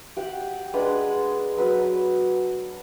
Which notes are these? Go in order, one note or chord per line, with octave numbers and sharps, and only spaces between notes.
G4 F#5
G#3 D4 B4 F#5
F#3 B4